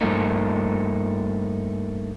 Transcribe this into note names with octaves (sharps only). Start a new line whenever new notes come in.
G2 F3 A3 A#3 D#4